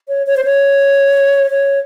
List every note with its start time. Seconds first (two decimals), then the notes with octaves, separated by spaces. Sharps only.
0.08 C#5
0.26 C#5
0.37 C5
0.45 C#5
1.51 C#5